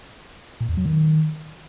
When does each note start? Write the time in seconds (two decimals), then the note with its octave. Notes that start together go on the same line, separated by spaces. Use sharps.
0.61 A#2
0.69 E2
0.77 F#3
0.86 D#3